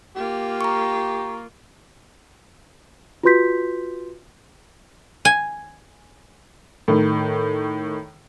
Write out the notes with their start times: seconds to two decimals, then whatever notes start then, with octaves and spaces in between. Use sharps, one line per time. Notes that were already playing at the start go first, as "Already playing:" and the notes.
0.16 A#3 F4 G4
0.61 A#5 C#6
3.23 F4 F#4 B4 C6 G6 B6
5.25 G#5
6.88 A2 D#3